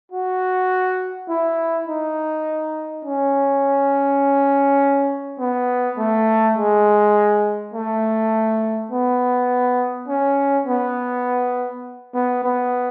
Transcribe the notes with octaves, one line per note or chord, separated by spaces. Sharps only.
F#4
E4
D#4
C#4
B3
A3
G#3
A3
B3
C#4
B3
B3
B3